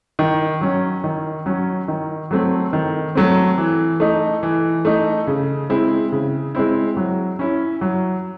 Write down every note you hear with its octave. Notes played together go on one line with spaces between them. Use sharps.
D#3
F#3 C#4
D#3
F#3 C#4
D#3
F#3 A3 C4
D#3
F#3 A3 C4
E3
A3 D#4
E3
A3 D#4
C#3
G#3 C4 E4
C#3
G#3 C4 E4
F#3
C#4 E4
F#3